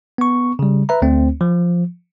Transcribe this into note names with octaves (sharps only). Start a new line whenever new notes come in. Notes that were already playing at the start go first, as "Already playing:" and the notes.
B3 C#6
C#3 G3
B4 E5 A#5
D2 A3 C4
F3